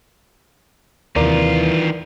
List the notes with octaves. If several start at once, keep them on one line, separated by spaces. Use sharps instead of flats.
D#2 C3 D#3 E3 F4 A#4 D5 A#5